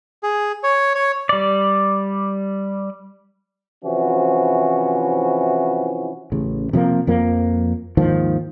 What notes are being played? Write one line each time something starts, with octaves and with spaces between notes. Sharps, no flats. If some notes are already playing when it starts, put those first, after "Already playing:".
G#4
C#5
C#5
G3 D5
C3 E3 F3 C#4 E4 F#4
A1 C#3
C3 F3 G#3 A#3
F2 F3 A#3
D#2 G#2 D#3 F3